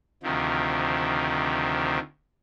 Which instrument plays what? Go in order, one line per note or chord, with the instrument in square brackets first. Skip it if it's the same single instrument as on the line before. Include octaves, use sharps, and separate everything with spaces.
[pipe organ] D2 C3 D#3 F3